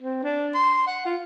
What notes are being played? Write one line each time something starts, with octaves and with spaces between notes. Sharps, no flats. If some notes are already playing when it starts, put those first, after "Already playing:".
C4
D4
C6
F#5
F4